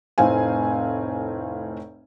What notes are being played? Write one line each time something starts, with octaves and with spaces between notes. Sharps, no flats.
F1 A2 C4 F5 G#5